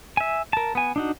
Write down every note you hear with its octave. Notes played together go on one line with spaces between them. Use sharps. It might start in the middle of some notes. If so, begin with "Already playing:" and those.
E5 G#5
A#4 A5
B3 G#5
D4 D#4 F#4